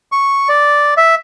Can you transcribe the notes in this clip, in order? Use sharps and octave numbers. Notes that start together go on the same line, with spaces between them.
C#6
D5
E5